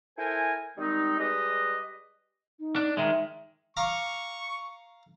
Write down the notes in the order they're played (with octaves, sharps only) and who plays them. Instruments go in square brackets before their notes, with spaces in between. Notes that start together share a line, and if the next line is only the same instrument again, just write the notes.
[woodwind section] E4 A4 A#4 C5 G#5
D#3 G3 G#3 C4 D#4
G3 G#3 G4 B4 D#5
[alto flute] D#4
[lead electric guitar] D4
[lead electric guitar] D#3 G#3 [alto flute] E5
[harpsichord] F5 A#5 D6 [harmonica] C#6